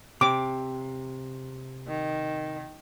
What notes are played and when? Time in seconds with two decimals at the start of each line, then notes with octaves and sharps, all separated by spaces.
0.21 C3 D6
1.87 D#3